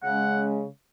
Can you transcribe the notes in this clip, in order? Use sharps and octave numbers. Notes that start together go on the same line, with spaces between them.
C#3 G#3 C#4 F#5